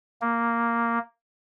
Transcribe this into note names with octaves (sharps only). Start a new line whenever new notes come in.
A#3